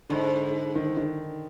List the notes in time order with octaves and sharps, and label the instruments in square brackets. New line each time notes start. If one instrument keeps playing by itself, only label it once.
[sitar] G#2 [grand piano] D3
[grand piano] D#3
D#3